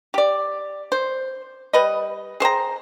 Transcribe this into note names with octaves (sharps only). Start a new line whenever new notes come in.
G4 D5
C5
G3 B4 D#5
G#4 C5 G5 A#5